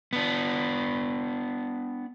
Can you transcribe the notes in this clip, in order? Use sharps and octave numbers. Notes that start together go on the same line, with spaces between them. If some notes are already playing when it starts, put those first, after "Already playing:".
B3 D4